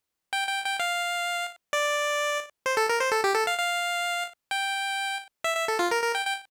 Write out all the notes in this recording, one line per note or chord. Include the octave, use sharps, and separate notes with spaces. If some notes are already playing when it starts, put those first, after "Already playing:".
G5
G5
G5
F5
D5
C5
A4
A#4
C5
A4
G4
A4
F5
F5
G5
E5
E5
A4
F4
A#4
A#4
G5
G5